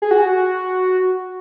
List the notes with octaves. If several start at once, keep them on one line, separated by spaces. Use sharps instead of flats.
G#4
F#4